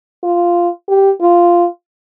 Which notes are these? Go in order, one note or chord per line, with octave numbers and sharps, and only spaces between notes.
F4
G4
F4